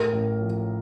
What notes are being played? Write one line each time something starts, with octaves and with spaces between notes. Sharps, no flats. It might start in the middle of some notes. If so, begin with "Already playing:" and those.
Already playing: A2 A#4
A1
F3